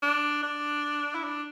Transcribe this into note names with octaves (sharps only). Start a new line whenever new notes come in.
D4
D4
E4
D4